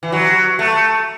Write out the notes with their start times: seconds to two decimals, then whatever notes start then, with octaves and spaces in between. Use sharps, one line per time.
0.03 E3
0.12 F#3
0.59 A3